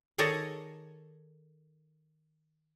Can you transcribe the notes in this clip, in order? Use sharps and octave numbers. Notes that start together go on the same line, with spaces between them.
D#3 G#4 A4 C#5 D5 A#5